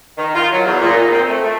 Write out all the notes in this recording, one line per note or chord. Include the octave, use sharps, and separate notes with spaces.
D#3
F4
F#3
E2
A#2
D#4
C4
A3
A3